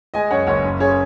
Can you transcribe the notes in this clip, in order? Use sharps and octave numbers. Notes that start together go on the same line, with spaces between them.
G#3 D#5 G#5
F#2 C#5 F#5
F#1 C#5 F#5
F#2
C#3 G#4 C#5